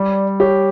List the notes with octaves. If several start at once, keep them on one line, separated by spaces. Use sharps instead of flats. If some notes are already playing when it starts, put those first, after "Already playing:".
Already playing: G3 D5
G4 C#5